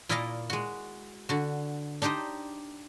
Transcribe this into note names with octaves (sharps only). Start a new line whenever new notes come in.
A#2 E4 D5 D#5 F5 A#5
G#3 F#4
D3 F#4
D4 D#4 G4 C5 D#5